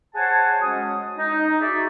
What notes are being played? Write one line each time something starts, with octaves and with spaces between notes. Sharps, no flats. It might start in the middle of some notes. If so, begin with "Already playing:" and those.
G#4 C5 C#5 F#5 G#5 A5
F#3 G#3 C#4 D#6
D#4
G#3 D#4 F#4 D5 E5